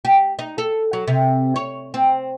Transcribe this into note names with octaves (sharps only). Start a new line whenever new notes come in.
G4
D#4
A4
F#3
C3
C#5
C4